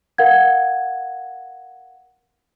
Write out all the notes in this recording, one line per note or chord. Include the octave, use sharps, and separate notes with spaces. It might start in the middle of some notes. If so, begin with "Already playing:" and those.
A#4 F5 F#5 G#6